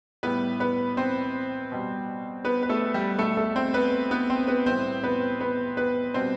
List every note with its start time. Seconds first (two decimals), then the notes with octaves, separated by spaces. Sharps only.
0.23 A2 G3 B3 B4
0.60 B3 B4
0.97 C4 C5
1.72 B2 G3
2.45 B3 B4
2.63 B4
2.69 A3 A4
2.94 G3 G4
3.19 B2 G3 A3 A4
3.37 A3 A4
3.56 C4 C5
3.74 B3 B4
4.11 B3 B4
4.30 C4 C5
4.48 B3 B4
4.66 A2 G3 C4 C5
5.03 B3 B4
5.41 B3 B4
5.77 B3 B4
6.14 B2 G3 C4 C5